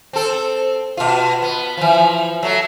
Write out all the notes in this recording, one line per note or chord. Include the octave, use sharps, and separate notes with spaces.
C4 A4
B2 F4
B3
E3 F3
F#3 A3